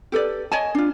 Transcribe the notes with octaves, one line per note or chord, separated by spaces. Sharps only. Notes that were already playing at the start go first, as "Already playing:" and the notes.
G4 A4 B4 D5
C#5 D#5 G#5 A5
D4 F4